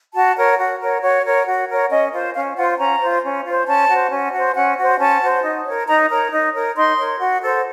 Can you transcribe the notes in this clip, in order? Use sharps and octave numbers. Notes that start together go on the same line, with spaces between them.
F#4 A5
A#4 C#5
F#4
A#4 C#5
F#4 C#5
A#4 C#5
F#4
A#4 C#5
C#4 D#5
F4 C5
C#4 F5
F4 C5 F#5
C#4 A#5
F4 C5
C#4
F4 C5
C#4 A5
F#4 C5
C#4
F#4 C5
C#4 F#5
F#4 C5
C#4 A5
F#4 C5
D#4
A#4 C#5
D#4 A#5
A#4 C#5 A#5
D#4
A#4 C#5
D#4 C6
A#4 C#5
F#4
A4 C5